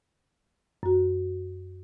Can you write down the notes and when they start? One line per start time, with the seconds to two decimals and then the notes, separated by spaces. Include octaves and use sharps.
0.83 F#2 F#4